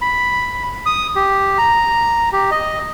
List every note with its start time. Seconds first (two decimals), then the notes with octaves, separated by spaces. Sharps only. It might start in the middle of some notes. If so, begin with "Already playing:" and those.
0.02 B5
0.86 D#6
1.16 G4
1.58 A#5
2.33 G4
2.51 D#5